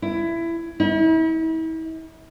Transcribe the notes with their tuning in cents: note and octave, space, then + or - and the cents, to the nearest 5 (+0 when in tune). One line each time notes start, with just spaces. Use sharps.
E4 +20
E4 -40